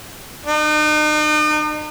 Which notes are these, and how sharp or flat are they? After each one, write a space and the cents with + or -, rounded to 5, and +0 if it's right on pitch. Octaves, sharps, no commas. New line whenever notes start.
D#4 -40